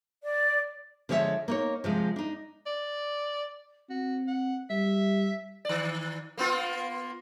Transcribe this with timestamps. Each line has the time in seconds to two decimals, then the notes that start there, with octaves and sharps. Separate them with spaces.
0.23 D5
1.09 D3 F3 G#3 C#5 E5
1.48 A#3 D#4 C#5
1.84 C3 F3 G#3
2.16 D4 D#4
2.66 D5
3.90 C4 F#4
4.27 F#5
4.70 G3 E5
5.65 D#3 D5
6.37 A#3 B3 F4